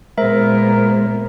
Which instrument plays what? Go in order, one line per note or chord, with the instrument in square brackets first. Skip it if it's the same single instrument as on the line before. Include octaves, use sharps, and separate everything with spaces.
[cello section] A#2 B3 [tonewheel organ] G#3 C5 [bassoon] A#4 [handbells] E5